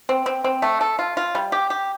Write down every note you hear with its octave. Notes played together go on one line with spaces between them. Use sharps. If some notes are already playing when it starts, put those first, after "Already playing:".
C4
C4
C4
A3
A4
F4
F4
G3
G4
G4